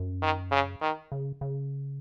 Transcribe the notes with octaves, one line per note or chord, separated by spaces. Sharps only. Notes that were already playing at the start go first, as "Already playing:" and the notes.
Already playing: F#2
D#3
C#3
D#3
C#3
C#3